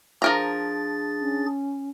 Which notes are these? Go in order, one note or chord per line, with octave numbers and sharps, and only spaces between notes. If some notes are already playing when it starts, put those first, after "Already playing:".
F3 D4 G#4 A#4 A#5 A6
C#4